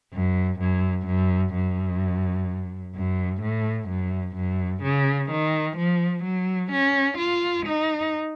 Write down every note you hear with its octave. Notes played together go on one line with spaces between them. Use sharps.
F#2
F#2
F#2
F#2
F#2
A2
F#2
F#2
C#3
D#3
F3
F#3
C#4
F4
D#4